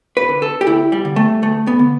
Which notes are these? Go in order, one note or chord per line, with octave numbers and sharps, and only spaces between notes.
B4
D3
A4
G4
D2 E4
G3
D3
A3
D2 A3
B3
D3